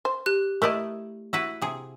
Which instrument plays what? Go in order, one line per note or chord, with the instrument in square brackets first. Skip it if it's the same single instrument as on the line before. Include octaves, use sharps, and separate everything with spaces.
[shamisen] C5
[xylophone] G4 F#6
[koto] A3 E4 D5 [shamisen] A#4 D#5
[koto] E4 F#4 B4
C3 G#4